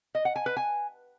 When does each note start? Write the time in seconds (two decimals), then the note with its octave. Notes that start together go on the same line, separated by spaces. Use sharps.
0.15 D#5
0.25 F#5
0.36 G#5
0.46 B4
0.57 G#5